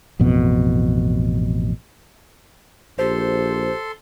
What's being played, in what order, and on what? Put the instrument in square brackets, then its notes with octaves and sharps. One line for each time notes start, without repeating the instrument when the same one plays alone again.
[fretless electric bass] A1 F2 B2
[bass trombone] A#1 [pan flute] G4 [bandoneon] A4 C6 [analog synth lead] C5